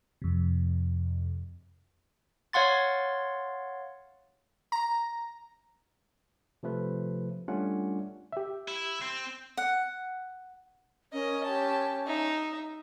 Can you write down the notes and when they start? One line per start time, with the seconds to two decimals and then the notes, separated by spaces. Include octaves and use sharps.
0.22 F2 C3
2.53 C#5 F5 F#5 C6 A6
4.72 A#5
6.63 C3 F3 A3 B4
7.48 G3 A3 C#4 D4 F4 F#5
8.33 G4 E5
8.68 E4
9.02 C4
9.57 F#5
11.13 C#4 A#4 D#5
11.44 G4 A5
12.06 D#4 E5